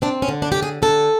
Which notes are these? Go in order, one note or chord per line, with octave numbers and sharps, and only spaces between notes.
C4 D4
C#4
D3
D4
D3 G4
G#4
D3 A4